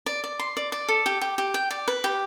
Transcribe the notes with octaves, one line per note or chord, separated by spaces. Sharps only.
D5
D5
C6
D5
D5
A4
G4
G4
G4
G5
D5
B4
G4